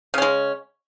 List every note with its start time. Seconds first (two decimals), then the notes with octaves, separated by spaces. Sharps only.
0.14 C#3
0.18 C#4
0.22 G#3